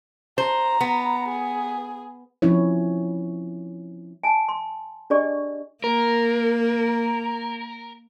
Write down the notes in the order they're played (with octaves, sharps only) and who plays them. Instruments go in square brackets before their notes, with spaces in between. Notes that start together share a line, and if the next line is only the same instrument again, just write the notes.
[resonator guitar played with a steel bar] C5 [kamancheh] A#5
[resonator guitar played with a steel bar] B3
[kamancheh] G#4
[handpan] F3 C4 C#4 E4 C#5
[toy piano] G#5 A5
C6
D4 G4 G#4 D5 D#5 C#6
[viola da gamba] A#3 [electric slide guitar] A#4